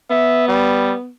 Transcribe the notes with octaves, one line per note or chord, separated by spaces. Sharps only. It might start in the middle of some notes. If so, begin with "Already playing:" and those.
B3 E5
G3